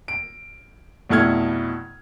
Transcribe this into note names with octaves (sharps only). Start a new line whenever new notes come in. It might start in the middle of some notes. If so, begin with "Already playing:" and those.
D7
F1 B2 E4 A4 F6 G#6